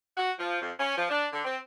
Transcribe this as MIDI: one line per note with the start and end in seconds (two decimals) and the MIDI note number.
0.17 0.31 66
0.39 0.58 53
0.61 0.72 41
0.78 0.95 61
0.97 1.07 53
1.09 1.26 62
1.33 1.44 50
1.45 1.57 60